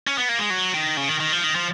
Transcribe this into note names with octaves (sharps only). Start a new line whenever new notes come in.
C#4
B3
A#3
G#3
F#3
D#3
C#3
D#3
D#3
F3
D#3
F3